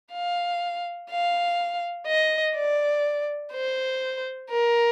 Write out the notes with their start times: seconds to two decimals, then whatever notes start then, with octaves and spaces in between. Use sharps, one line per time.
0.12 F5
1.10 F5
2.07 D#5
2.55 D5
3.53 C5
4.51 A#4